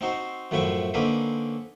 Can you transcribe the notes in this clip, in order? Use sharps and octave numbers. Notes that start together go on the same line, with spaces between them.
C4 D#4 F#4 C5
F#2 A2 F3 E4 G5 C#6
D3 A#3 C4 C#4 D#4 B4